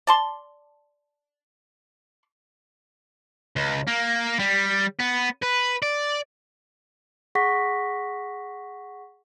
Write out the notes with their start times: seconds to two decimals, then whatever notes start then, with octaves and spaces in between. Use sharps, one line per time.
0.07 D5 A5 C6
3.56 C#2
3.87 A#3
4.39 G3
4.99 B3
5.42 B4
5.82 D5
7.35 G#4 F#5 C#6 A#6 B6